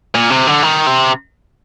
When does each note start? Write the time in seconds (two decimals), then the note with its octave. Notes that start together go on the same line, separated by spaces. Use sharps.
0.15 A#2
0.30 C3
0.47 D3
0.63 D#3
0.87 C3